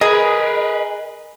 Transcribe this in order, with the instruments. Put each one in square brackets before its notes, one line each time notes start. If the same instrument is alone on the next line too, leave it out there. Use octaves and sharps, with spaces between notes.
[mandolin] G#4 [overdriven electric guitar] A#4 B4 [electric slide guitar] D#5